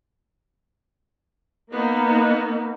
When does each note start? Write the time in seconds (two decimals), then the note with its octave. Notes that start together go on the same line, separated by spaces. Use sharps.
1.72 A#3 B3 D#4